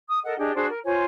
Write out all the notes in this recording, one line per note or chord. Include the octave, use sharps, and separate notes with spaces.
D#6
A4 A#4 D#5 F#5
D4 G4 G#4 D#5
D4 F#4 G#4 C5
A#4
F4 C5 C#5 G#5